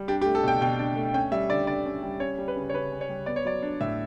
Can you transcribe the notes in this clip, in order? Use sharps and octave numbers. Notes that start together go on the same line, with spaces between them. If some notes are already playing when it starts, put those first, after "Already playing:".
Already playing: G3
D4 G4
G4
A3
A4
B2 G5
B2 G5
D4
A3
C#4 G5
G3 E5
D3 D5
D3 D5
C#4
G3
C#4 C#5
G3
B4
C#3
C#5
C#3 B4
C#4
C#5
G3
B3 D5
C#5
F#3 D5
D4
A2 E5